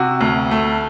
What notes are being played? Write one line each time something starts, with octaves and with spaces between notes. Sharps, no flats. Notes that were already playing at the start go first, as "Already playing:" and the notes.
Already playing: C3 F#4
D2
A3